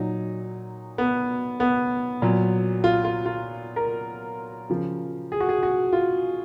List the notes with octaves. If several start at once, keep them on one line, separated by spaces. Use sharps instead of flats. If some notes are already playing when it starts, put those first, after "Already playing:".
Already playing: A#2 F#3 D#4
B3
B3
A#2 F#3
F4
F4
F4
A#4
C#3 F3
G#4
F#4
G#4
F#4
F4